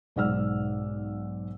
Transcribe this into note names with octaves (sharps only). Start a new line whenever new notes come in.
B1 G#2 D5 F#5 E6 F6